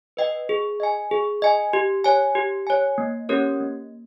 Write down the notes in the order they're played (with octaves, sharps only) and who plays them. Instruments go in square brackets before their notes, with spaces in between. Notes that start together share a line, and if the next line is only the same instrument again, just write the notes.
[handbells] B4 D#5 G5
G#4
D#5 G#5
G#4
D#5 G#5
G4
C#5 G#5
G4
C#5 G#5
A#3
C#4 G4 A#4 C#5
A#3